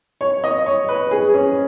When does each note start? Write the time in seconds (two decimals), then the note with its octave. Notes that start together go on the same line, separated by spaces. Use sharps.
0.21 C#5
0.44 D#5
0.66 C#5
0.89 B4
1.11 G#4
1.34 C#4